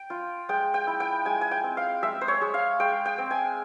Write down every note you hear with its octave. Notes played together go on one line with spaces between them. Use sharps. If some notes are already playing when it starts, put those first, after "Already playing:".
Already playing: G5
F4
G#3 G5
G5
E4
G5
G#3 G#5
G#5
G5
C4
F5
G#3 E5
C5
C#5
G#3
F5
G#3 G5
G5
C4
G#5